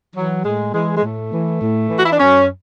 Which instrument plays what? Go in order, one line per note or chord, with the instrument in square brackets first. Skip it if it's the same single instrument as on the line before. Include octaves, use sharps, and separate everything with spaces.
[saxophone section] E3 F#3
A2 G#3
E3 G#3
G#3
A2 A3
E3
A2
E3
F#4
E4
D4
F#2 C#4